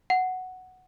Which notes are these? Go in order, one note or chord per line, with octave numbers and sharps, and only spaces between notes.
F#5